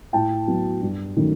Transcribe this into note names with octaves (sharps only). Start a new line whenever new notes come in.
A2 G5 A5
F#3 B3
G2
D#3 F#3 A3 C#4